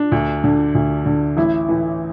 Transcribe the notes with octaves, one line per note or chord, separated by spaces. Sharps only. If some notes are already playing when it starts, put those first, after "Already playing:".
Already playing: D4
D2
D3
D2
D3
A1 E4
A2 E3